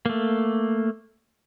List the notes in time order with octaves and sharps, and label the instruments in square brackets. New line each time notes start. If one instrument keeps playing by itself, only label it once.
[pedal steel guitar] A3 A#3